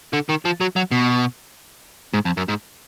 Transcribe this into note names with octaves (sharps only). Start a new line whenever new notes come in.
D3
D#3
F3
F#3
F#3
B2
G#2
F2
F#2
G#2